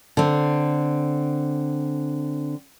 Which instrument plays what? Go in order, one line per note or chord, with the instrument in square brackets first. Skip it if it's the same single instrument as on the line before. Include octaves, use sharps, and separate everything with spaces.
[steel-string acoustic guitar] D3 C4